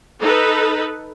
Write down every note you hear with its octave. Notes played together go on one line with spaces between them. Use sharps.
D#4 A4 B4